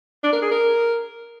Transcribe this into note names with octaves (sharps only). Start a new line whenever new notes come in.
D4
A#4
G#4
A#4